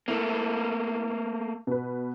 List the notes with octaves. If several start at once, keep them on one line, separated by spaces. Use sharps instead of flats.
A3 A#3 E4
B2 B4